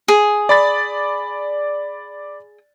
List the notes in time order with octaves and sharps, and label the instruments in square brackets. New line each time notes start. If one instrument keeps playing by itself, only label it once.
[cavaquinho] G#4
[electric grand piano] D5 B5 A6